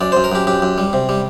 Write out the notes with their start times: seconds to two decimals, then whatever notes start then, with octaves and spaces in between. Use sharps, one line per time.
0.01 F#2 D5
0.12 F#2 C5
0.24 A#4
0.32 F#2 G4
0.47 F#2 G4
0.62 F#2
0.78 G3
0.93 C3
1.09 G3